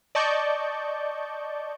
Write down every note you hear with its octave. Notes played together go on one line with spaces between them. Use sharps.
D5 D#5 A5 C#6 G6